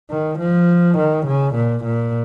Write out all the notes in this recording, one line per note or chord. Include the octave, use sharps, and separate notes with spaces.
D#3
F3
D#3
C#3
A#2
A#2